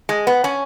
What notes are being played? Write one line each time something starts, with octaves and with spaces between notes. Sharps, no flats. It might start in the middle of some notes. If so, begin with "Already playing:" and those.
G#3
B3
C#4